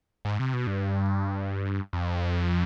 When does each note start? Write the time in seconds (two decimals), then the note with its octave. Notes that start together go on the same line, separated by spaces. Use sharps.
0.25 G#2
0.40 C3
0.53 B2
0.67 G2
1.93 F2